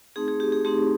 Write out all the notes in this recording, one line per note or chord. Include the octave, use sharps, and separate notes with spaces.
A3 C4 D#4 G#4
G#4
G4
G#4
A3 C4 D#4 G4